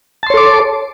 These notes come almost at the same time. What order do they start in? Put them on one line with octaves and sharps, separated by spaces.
A5 C6 C#5 A4 D6